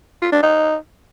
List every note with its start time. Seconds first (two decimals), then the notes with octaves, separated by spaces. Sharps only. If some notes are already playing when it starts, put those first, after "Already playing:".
0.22 F4
0.32 D4
0.43 D#4